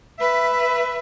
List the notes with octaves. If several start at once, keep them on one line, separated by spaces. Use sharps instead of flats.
B4 E5